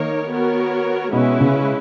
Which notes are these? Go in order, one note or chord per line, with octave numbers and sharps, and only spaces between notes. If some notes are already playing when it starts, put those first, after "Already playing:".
Already playing: D#3 A#3 D#4 A#4 C#5
B3 F#4 A#4 C#5
B2 G#3 C#4 E4 B4
C#3